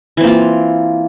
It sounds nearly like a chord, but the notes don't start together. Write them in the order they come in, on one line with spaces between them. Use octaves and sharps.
E3 C4 A#3 F4